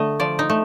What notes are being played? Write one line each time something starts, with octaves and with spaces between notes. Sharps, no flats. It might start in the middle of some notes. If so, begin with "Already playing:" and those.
Already playing: D3 A3 D#5
F3 D5
D#4
A3